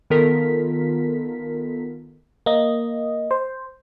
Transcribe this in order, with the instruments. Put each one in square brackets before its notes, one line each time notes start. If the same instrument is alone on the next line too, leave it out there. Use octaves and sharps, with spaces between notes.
[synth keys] D#3 B3 F4 A4 A#4 B6
[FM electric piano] A#3 D#5
C5